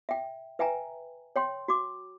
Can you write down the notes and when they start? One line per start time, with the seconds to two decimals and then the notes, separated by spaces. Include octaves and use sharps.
0.09 E5 G5
0.59 B4 E5 G5 G#5 A#5
1.36 C#5 G5 C6
1.68 F#4 D6